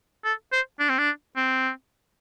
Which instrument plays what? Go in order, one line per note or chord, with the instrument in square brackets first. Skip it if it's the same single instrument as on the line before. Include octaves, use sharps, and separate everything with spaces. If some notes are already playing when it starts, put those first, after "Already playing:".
[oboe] A4
C5
D4
C4
D4
C4